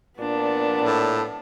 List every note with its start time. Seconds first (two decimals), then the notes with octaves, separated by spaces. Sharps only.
0.20 A#2 B3 D4 A5
0.82 A2